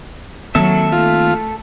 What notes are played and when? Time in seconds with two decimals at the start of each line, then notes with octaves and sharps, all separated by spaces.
0.55 D#3 F#3 A#3 C4 A4 E5
0.92 A3 F4